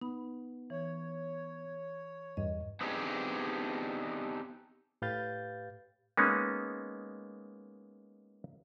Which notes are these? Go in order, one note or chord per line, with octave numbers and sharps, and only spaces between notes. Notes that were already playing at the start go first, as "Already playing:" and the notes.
B3 D#4 B5
E3 C#5
E2 G2 D#5
B3 C4 D4 D#4 G4 G#4
A2 G4 B4 F5 G6 A6
G#3 A#3 B3 C#4 D#4